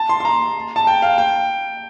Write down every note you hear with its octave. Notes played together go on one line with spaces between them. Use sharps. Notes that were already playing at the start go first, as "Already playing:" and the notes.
Already playing: A5
C6
C6
A#5
A5
G5
F5
G5